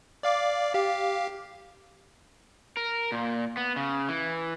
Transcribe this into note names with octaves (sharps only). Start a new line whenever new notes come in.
D5 F5 D6
G4 F5
A#4
A#2
B3
C#3
E3